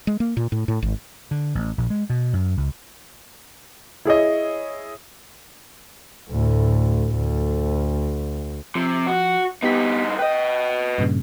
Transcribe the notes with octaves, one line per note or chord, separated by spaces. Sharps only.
G#3
A#3
A#2
A2
A2
G#1
D3
A1
A#1
G#3
B2
F#2
C#2
E4 G#4 C#5 D#5
D2 A2
D2
C3 F3
F#4
G2 B3 D#4 G4 B6
B4 D#5 G5
G2 A#2 C#3